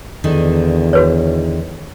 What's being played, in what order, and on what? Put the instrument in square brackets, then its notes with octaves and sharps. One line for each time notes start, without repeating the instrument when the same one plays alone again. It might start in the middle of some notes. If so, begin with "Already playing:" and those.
[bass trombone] E2 [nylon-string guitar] D3 D#3
[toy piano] F#4 B4 C#5